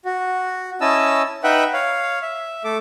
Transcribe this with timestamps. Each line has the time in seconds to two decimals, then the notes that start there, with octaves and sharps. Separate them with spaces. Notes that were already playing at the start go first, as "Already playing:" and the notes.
0.05 F#4
0.81 C#4 E4 D#5 A5 E6
1.44 D#4 B4 E5 F#5 G5 B5
1.73 C#5 F5
2.22 E5
2.64 A3 A4 D6